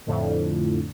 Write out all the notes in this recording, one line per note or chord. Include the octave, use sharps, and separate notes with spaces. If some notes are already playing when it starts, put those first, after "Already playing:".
F2 A2 D3